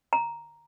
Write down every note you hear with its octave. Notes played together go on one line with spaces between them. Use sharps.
A#5